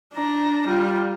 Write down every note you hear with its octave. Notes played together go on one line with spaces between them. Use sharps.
D4 A#5
G3 F4